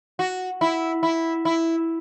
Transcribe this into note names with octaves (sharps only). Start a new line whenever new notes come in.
F#4
E4
E4
E4